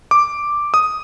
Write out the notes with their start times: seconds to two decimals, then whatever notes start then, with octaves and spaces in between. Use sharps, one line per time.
0.11 D6
0.74 D#6